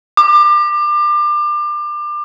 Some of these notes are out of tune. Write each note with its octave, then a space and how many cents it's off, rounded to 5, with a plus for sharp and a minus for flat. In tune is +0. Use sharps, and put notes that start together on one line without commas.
D6 +30